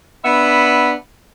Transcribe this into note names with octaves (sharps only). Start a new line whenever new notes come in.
B3 D4 E5 F#5 B5